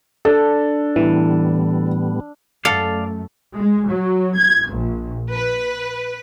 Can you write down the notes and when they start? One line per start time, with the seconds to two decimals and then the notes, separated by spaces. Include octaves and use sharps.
0.25 D4 A4
0.96 A2 E3 G3 B3
2.65 F#2 A3 A4 D5 F5
3.56 G#3
3.89 F#3
4.36 G#6
4.69 A#1
5.31 B4